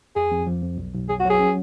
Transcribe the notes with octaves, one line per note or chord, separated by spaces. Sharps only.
F2 G#4
F2
F3
F2
B1
B1
F#3 G#4
F#4
F#3 G#4
C#4